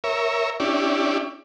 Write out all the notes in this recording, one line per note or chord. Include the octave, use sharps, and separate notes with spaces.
A#4 C#5 E5
C#4 D4 E4 G4 D5